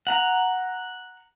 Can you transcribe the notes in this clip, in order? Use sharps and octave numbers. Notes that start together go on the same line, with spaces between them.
F#5 A#5